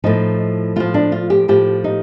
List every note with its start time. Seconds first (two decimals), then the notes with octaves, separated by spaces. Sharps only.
0.04 A2 F3 D#4
0.76 A2 F3 F4
0.94 D4
1.12 F4
1.30 G4
1.48 A2 F3 G4
1.84 D#4